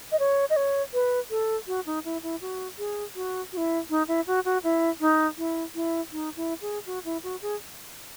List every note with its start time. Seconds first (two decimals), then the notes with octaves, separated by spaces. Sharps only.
0.12 D#5
0.19 C#5
0.50 D#5
0.56 C#5
0.94 B4
1.31 A4
1.67 F#4
1.86 D#4
2.05 E4
2.23 E4
2.41 F#4
2.78 G#4
3.16 F#4
3.53 F#4
3.57 E4
3.90 D#4
4.08 E4
4.27 F#4
4.45 F#4
4.64 E4
5.01 D#4
5.38 E4
5.75 E4
6.12 D#4
6.36 E4
6.62 G#4
6.86 F#4
7.05 E4
7.23 F#4
7.42 G#4